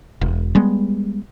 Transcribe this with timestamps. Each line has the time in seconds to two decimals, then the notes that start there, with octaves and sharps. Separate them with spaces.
0.21 E1
0.55 G3 G#3 B3